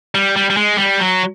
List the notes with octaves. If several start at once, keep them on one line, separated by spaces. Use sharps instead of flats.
G3
G3
G3
G#3
G3
F#3